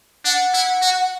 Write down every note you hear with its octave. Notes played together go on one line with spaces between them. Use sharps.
D4 F#5
E4
F#4